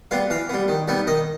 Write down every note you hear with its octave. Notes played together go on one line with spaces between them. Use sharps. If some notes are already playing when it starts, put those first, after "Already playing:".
G3 B3 F5
E3 F5
G3 B3
D#3
G3 B3 D#4
D#3 D#5